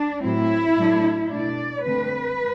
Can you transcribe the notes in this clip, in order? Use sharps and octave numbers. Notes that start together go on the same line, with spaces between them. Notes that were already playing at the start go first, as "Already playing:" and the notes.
Already playing: D4
A2 F#3 C4 E4
A2 F#3 A3 D4
B2 A3 D4 D5
D3 A3 C4 B4